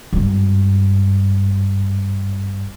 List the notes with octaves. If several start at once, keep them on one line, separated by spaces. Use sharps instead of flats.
G#1 G2